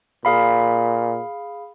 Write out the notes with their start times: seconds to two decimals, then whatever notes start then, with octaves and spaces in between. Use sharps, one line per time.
0.25 A#2 G#4 F5 B5